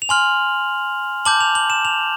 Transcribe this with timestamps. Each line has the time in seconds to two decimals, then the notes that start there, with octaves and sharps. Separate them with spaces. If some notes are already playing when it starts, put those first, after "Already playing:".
0.02 F7
0.09 G#5 C6 F6 F#7
1.25 A5 D6 G6 F#7
1.40 F7
1.55 F#7
1.70 E7
1.85 F7